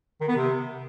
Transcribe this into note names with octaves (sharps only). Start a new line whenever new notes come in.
D#3
B3
C3